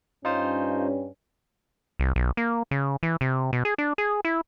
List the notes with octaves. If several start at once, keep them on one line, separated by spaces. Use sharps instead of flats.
G2 C#4 D#4 F4 C5
C2
B1
A#3
C#3
E3
C3
B2
G#4
D4
G#4
E4